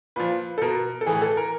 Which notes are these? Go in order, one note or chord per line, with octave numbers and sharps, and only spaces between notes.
A#2 F3 B4
A4
B2 A#4
A4
A2 E3 G#4
A4
A#4